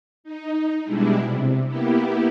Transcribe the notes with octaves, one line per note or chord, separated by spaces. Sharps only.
D#4
B2 G3 G#3 D4 E4
C3
A#3 B3 E4 G4